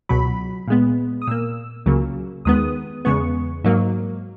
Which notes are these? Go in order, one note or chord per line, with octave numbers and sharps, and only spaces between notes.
C#2 B2 F#3 B5
A#2 G#3 B3
D#6
A#2 A#3 E6
C#2 C#3 F#3 A#3
D#2 D#3 G#3 B3 D#6
E2 C#3 G#3 B3 C#6
G#2 F#3 A#3